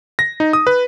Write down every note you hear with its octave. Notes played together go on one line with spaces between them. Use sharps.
A#6
D#4
D#6
B4